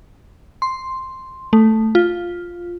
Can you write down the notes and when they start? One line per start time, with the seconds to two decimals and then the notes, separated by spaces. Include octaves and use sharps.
0.62 C6
1.53 A3
1.95 F4